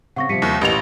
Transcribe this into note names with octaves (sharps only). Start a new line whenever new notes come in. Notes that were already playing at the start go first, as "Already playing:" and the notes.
C#3 C4 F#5 C#6 A#6
C3 F3 G3 B6 C#7 D#7
D#2
A1 A#2 C#4 G4 B4 F#5 F7